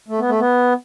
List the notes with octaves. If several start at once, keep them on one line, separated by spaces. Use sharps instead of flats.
A3
B3
A3
B3